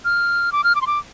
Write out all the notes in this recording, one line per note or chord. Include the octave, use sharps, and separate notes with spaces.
F6
D6
F6
D6
C6
D6